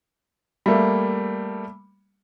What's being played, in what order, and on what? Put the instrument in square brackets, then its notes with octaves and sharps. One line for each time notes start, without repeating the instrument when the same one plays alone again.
[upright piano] G3 A3 A#3